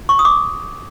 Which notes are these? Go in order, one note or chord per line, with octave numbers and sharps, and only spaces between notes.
C#6
D#6
D6